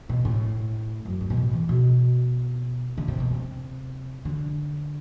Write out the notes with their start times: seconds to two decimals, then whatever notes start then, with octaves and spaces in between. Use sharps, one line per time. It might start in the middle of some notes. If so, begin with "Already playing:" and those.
0.09 B2
0.25 A2
1.05 F#2
1.21 G2
1.30 B2
1.37 A2
1.53 E3
1.69 B2
2.97 D3
3.08 C3
3.20 B2
3.31 C3
4.25 D3